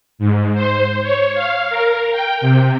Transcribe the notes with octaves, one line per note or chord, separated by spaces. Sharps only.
G#2
C5
C#5
F5
A#4
G5
C3